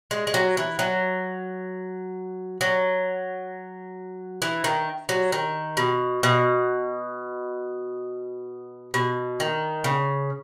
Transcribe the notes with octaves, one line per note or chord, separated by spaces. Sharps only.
G#3
G#3
F#3
E3
F#3
F#3
E3
D#3
F#3
D#3
B2
B2
B2
D#3
C#3